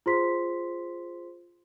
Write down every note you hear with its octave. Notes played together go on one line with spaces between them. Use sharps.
F4 G#4 C5 C6 B6